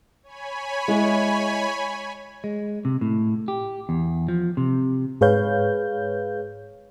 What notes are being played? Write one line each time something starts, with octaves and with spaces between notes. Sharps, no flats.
C#5 G#5 B5
G#3 E4
G#3
C3
A2
G4
E2
F3
C3
G#2 G#4 B4 C#5 F5 G6